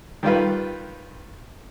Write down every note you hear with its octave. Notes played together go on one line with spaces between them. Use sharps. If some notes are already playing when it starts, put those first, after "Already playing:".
D#3 G3 F4 B4